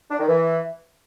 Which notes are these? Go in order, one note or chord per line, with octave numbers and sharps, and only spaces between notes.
D4
D#3
E3